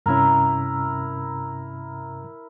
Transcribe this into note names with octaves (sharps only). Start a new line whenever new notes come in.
G2 C3 C#4 E4 A#4